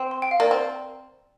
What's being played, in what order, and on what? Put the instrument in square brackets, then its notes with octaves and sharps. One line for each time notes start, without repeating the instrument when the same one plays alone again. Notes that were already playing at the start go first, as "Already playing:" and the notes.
Already playing: [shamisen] C4
[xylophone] C6
G5
F5
[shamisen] A#3 [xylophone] D5
[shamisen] C4